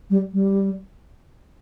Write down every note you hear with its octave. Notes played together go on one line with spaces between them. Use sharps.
G3
G3